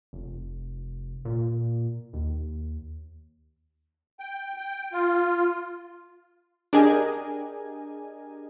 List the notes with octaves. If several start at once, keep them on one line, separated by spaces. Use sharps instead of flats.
F1
A#2
D#2
G5
G5
F4
D4 G4 G#4 A#4 D#5 G#5